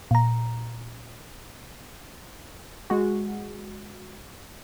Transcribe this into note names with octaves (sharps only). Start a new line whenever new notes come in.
A#2 A#5
G#3 F#4